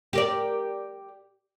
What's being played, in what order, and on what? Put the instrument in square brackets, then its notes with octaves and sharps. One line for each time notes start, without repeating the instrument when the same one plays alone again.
[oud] G4 A#4 D5